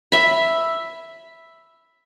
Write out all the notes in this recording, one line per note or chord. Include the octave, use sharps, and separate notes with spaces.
E5 B5